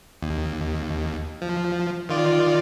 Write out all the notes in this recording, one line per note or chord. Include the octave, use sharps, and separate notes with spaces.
D#2
F3
D#3 F4 D5